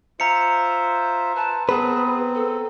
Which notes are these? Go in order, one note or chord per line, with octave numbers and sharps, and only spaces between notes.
F4 C5 E5 A#5 C#7
B4 A5
B3 C4 G#4 B4
A4